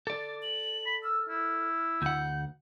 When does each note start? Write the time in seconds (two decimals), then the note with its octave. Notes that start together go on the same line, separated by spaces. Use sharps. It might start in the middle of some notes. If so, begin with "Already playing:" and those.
0.07 A4 D5 D6
0.42 F#7
0.86 B5
1.04 E6 F6
1.29 E4
2.02 D2 F#5 G6